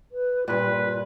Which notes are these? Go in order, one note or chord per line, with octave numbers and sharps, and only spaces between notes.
B4
G2 A#2 F4 B4